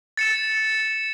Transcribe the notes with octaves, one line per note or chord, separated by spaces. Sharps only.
A6 C#7 E7